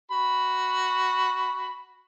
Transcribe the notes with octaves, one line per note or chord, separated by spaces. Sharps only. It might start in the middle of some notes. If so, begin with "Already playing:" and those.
F#4 B5